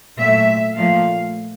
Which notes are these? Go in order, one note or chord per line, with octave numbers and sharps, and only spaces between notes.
A#2 F#3 A3 E5
A#2 F3 A3 F5